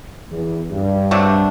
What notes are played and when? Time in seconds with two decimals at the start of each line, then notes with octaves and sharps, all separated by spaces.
0.31 E2
0.71 G2
1.11 C3 F#3 A3 D4